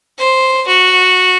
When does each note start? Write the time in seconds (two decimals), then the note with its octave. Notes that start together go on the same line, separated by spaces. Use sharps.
0.18 C5
0.68 F#4